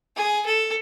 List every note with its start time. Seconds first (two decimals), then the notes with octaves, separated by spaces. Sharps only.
0.16 G#4
0.46 A4